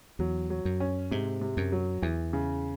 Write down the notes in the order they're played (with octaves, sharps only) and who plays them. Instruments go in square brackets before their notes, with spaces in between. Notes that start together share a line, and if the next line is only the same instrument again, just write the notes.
[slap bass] E2 [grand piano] F#3
[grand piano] F#3
[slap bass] F#2
[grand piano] C#4
[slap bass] G#2 [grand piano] C3
[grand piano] C3
[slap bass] F#2
[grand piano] F#3
[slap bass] E2 [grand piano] E3
[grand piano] C#3